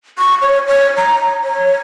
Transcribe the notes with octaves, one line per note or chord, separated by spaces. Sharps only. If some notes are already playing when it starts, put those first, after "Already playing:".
C#6
C#5
C#5
A#5
C#5